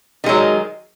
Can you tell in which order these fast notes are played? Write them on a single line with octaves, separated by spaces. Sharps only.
D#3 G#3 F#3